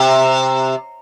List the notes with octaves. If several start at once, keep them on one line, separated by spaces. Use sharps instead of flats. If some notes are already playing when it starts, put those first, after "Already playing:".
Already playing: C3